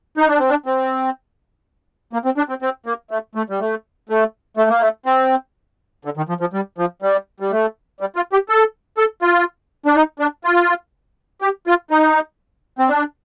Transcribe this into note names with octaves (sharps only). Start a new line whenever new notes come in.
D#4
D4
C4
D4
C4
A#3
C4
D4
C4
C4
A#3
A3
A3
G3
A3
A3
A3
A#3
A3
C4
D3
D#3
F3
F3
G3
F3
G3
G3
A3
G3
F4
G4
A4
A4
F4
D4
D#4
D4
F4
G4
F4
D#4
C4
D4